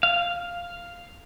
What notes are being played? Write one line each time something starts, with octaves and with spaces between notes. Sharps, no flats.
F5